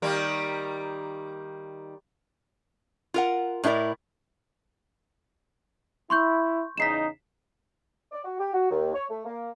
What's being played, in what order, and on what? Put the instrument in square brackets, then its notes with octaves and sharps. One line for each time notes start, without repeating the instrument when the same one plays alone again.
[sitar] D#3 G3 A#3
[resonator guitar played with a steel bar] F4 A#4 F#5
A2 D4 E4 A#4 D5
[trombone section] E4 [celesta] C6 C#6 G6
[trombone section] E2 C#3 D#4 [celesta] B6 C7 E7
[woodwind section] D5
F#4
G4
F#4
D#2
C#5
A3
A#3